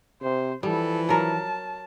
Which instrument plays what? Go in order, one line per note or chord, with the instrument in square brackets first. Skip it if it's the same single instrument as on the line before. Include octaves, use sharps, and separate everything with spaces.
[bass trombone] C3 [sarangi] C5
[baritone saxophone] E3 [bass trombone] F3 [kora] G3 [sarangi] A4
[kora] F#3 A#4 [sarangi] A5